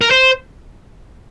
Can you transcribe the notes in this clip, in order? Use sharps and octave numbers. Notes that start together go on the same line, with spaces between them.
A#4
C5